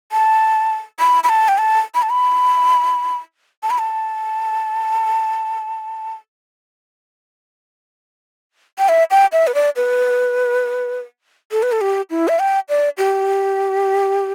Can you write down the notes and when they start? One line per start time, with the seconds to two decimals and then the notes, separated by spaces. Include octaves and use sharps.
0.12 A5
1.00 B5
1.24 B5
1.29 A5
1.48 G5
1.58 A5
1.95 B5
2.02 A5
2.10 B5
3.63 A5
3.70 B5
3.78 A5
8.79 G5
8.89 E5
9.11 G5
9.33 E5
9.47 B4
9.55 D5
9.76 B4
11.52 A4
11.63 B4
11.72 A4
11.81 G4
12.10 E4
12.28 E5
12.39 G5
12.69 D5
12.98 G4